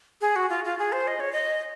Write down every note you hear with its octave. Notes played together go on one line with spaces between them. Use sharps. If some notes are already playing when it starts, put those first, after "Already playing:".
G#4
F#4
F4
F4
G#4
C5
D#5
C#5
D#5